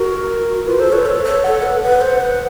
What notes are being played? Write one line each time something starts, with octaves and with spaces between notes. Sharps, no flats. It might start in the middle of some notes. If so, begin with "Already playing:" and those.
Already playing: F#4 A#4
F4 B4
A4 C5
B4 C#5
A4
A4
A4 F#5
B4
B4
C5
B4